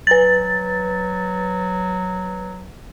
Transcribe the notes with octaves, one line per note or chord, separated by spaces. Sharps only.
F#3 B4 A6